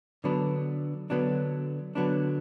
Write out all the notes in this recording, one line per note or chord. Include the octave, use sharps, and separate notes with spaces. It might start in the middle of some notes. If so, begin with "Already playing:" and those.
D3 F#3 B3 D4
D3 F#3 B3 D4
D3 F#3 B3 D4